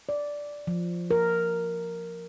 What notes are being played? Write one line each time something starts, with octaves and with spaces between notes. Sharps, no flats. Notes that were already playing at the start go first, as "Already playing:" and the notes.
D5
F3
A#4